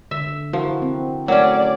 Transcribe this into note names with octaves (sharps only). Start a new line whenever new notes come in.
D3 E5
F3 E4 F#4 A#4
C4
F#3 A3 C#4 A#4 C#5 D5